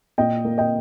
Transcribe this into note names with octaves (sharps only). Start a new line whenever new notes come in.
A#2 D#5 G5
A#3
D#5 G5